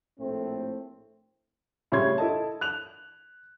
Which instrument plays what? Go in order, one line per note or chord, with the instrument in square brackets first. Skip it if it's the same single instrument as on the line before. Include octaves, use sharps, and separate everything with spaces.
[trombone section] A#1 A2 A3 C4
[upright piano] A2 C#3 G3 C#5 C6 G#6
E4 A4 D#5 A5
F#6 F7